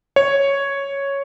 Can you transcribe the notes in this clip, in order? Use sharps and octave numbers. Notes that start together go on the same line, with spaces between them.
C#5